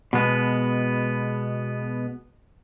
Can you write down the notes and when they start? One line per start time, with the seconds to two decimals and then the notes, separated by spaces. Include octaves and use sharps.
0.13 B2 G#3 B3